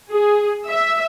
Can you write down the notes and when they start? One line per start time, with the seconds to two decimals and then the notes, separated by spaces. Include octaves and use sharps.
0.10 G#4
0.68 E5